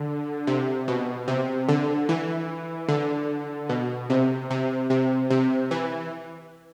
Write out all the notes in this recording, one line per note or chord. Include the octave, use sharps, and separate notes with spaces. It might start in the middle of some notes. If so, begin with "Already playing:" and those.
Already playing: D3
C3
B2
C3
D3
E3
D3
B2
C3
C3
C3
C3
E3